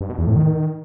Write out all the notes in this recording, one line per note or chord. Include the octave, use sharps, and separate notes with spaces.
G2
B2
E2
A2
D#3